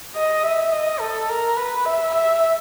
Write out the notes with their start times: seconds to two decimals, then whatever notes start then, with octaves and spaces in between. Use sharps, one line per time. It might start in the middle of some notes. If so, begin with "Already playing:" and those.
0.16 D#5
0.43 E5
0.72 D#5
1.00 A4
1.29 A#4
1.57 B4
1.85 E5
2.14 E5